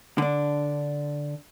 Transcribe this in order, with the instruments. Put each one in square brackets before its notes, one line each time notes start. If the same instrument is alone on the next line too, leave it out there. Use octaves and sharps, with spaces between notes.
[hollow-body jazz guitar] D3 D4